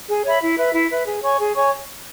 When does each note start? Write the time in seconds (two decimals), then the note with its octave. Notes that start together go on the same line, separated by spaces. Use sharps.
0.09 G#4
0.24 C#5 E5 B5
0.41 E4
0.57 B4 E5
0.73 E4
0.90 B4 E5
1.06 G#4
1.23 C#5 G#5 C#6
1.39 G#4
1.56 C#5 G#5 C#6